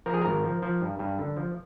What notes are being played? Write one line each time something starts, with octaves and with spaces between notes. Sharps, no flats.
F3 A#4
G#4
G#1 A#4
F3
F3
G2
G2
D3
F3